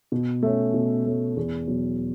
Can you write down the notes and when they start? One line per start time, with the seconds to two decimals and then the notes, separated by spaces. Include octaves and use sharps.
0.12 B2
0.43 A3 C#4
0.74 B2
1.06 A3 C#4
1.37 E2
1.68 B2 F#3